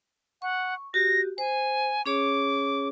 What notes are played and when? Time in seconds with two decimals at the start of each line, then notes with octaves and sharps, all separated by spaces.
0.42 F#5 C#6
0.94 F#4 G4 A#6
1.38 C5 G#5
2.06 C#4 G#4 C#5 D6